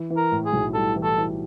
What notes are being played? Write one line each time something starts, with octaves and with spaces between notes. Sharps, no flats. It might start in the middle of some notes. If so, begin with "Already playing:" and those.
Already playing: E3
E3
A#4
A2
G#4
B1
G3 A4
E3
A4
E3